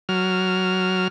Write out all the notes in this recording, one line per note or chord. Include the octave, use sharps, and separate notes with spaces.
F#3 F6